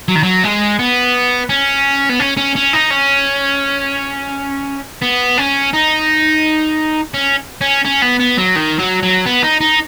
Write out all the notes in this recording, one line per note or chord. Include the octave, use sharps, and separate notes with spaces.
F#3
D#3
F#3
G#3
B3
C#4
B3
C#4
C#4
C#4
D#4
C#4
B3
C#4
D#4
C#4
C#4
C#4
B3
B3
F#3
D#3
F#3
F#3
B3
D#4
D#4